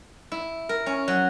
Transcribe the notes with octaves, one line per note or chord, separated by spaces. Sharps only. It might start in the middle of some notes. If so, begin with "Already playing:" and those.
E4
A#4
C#4
F#3